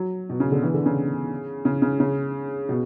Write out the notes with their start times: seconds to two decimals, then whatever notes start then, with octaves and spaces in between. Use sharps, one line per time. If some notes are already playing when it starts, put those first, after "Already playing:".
Already playing: F#3
0.30 B2
0.40 C#3
0.52 D3
0.62 E3
0.74 D3
0.86 C#3
1.65 C#3
1.82 C#3
2.00 C#3
2.69 B2